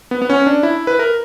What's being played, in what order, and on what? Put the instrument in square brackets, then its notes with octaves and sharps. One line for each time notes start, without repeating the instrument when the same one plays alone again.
[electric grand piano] B3
B3
C#4
D4
E4
B4
A#4